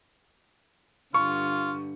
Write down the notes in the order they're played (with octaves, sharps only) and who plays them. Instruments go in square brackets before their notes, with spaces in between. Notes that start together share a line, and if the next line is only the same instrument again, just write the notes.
[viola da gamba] G2 D3 [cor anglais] F4 [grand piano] C#6